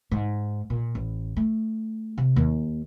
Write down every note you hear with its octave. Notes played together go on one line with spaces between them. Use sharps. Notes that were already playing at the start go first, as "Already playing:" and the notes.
G#2
A#2
A1
A3
C3
D#2